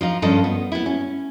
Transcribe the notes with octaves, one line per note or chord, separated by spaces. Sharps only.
F3 D#4 F4
G2 F3 C#4 A4 D#5
B3
B3 E4
C#4